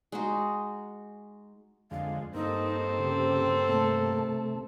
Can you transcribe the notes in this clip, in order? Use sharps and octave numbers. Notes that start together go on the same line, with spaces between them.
G#3 D#4 F#4
F2 D3 G#3 F5
G2 A#3 C4 D#4 A4
C#3 G4 C5
C3 A3 A5